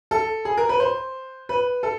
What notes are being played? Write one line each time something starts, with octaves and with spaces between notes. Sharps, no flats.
A4
G#4
A#4
B4
C5
B4
A4